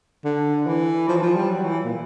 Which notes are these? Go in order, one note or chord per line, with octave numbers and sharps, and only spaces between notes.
D3
E3
F3
E3
F3
G3
F#3
E3
A#2